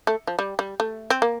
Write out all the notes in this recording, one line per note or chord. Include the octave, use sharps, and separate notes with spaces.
A3
F3
G3
G3
A3
C4
A#3